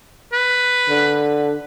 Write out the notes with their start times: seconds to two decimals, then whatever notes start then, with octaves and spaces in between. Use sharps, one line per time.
0.33 B4
0.90 D3